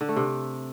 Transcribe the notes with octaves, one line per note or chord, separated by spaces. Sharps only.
D3
A3
C3